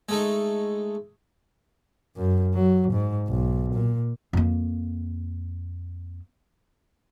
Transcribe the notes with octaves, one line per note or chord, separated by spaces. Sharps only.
G#3 A3 D#4
F#2
F#3
G#2
B1
A#2
F2 A#3